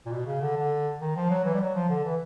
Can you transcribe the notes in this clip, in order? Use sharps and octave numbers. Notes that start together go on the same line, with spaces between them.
A#2
B2
C#3
D3
D3
D#3
F3
F#3
E3
G3
F#3
F3
D3
E3